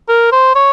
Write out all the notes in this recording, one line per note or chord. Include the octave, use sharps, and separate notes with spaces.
A#4
C5
C#5